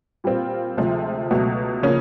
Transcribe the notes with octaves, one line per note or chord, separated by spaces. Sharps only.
A#2 G3 C4 F4
D2 C3 F3 G#3
C#2 B2 F#3 A3
C#3 F3 A#3 C#4